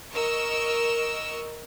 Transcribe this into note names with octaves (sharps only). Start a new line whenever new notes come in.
A#4 D#5 C#6 E6